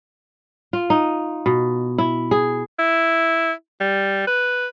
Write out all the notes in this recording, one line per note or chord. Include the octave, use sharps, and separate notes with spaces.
F4
D#4
B2
E4
G#4
E4
G3
B4